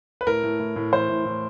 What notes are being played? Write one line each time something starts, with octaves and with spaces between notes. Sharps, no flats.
B4
A2 A#4
A2
A2
A2
E3 C5
A2
A2